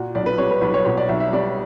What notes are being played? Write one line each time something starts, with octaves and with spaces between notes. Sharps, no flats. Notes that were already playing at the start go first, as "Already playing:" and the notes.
Already playing: A#2 F#4
B1 D5
B4
G3 C#5
B4
B1 B4
C#5
B2 C#5
D5
B1 E5
E5
G3 D5